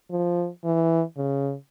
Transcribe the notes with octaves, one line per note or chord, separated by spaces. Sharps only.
F3
E3
C#3